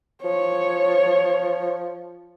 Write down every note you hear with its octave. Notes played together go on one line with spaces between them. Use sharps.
F3 C#5